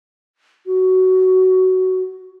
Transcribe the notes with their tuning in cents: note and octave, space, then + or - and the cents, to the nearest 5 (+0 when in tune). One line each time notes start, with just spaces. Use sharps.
F#4 +15